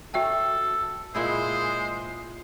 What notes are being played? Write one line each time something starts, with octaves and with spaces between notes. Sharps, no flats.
F#4 A4 E5 G5
A#2 G#3 E4 G#4 C5